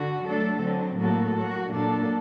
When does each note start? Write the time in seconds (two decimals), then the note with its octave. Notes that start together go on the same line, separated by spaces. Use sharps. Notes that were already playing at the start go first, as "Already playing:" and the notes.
Already playing: D3 F#4
0.26 F#3 A3 D4 A4
0.62 D3 F#3 C4
0.98 A2 F#3 A#3 F#4 A4
1.35 F#3 A#3 F#4
1.70 A#2 F#3 A#3 D4 A4